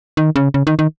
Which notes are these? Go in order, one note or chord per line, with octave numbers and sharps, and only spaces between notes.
D#3
C#3
C#3
D#3
D#3